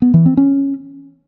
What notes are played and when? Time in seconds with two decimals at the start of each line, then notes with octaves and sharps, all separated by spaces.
0.02 B3
0.14 E3
0.26 C4
0.37 C#4